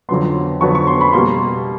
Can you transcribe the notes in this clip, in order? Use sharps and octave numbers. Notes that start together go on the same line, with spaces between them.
F2 D3 F#3 B3 C6
F2 D3 F#3 B3 C#6
C#6
C6
B5
B2 G3 A#3 C6